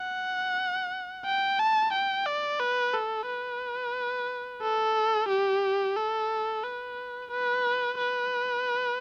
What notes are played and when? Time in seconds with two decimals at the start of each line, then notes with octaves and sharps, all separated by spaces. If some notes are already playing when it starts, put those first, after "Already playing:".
Already playing: F#5
1.25 G5
1.59 A5
1.93 G5
2.26 D5
2.60 B4
2.93 A4
3.27 B4
4.62 A4
5.28 G4
5.97 A4
6.64 B4
7.31 B4
7.98 B4